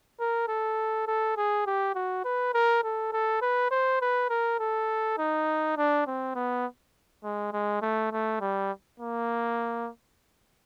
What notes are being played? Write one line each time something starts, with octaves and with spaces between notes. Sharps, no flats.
A#4
A4
A4
G#4
G4
F#4
B4
A#4
A4
A4
B4
C5
B4
A#4
A4
D#4
D4
C4
B3
G#3
G#3
A3
A3
G3
A#3